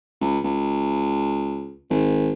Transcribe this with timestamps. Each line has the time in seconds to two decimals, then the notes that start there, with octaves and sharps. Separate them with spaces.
0.21 C#2
0.44 C#2
1.90 G#1